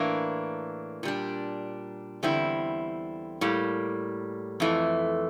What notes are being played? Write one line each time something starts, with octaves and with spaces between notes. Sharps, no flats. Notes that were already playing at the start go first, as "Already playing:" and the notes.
Already playing: A2 E3 A#3 D4
A#2 G3 D4
E2 D3 G3 C4 E4
A2 G3 A#3
F2 E3 A3